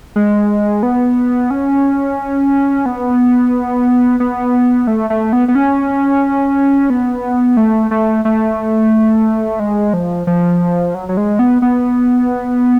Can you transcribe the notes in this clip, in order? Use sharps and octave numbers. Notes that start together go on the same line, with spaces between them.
G#3
B3
C#4
B3
B3
A3
A3
B3
B3
C#4
B3
A3
A3
A3
G#3
F3
F3
F#3
F#3
G#3
B3
B3